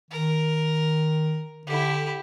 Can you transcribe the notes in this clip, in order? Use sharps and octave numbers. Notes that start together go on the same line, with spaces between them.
D#3 A#4
D3 E4 G4